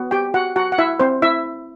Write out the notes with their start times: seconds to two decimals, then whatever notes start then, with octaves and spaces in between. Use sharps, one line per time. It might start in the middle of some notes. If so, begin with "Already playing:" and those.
Already playing: B3 F#4
0.11 G4 G5
0.34 F#4 F#5
0.56 F#4 F#5
0.72 F#5
0.78 E4 E5
1.00 C4 C5
1.22 E4 E5